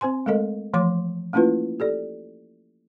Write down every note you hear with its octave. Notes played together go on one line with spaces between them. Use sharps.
C4 C5 G#5 C6
G#3 A3 A4 A#4 D#5
E3 F3 A3 C#5 C6 D6
A3 A#3 C#4 E4 F4 B4
G4 A4 D5